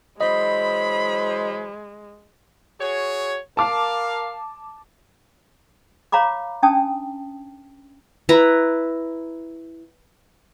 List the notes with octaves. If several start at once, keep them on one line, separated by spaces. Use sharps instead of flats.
E3 F#3 G#3 C5 D#5 B5
F#4 G#4 C#5
A#4 F5 A5 D6
C#5 F5 A#5 B5 D6
C#4 D4 G5 A5 D#6
E4 B4 A#5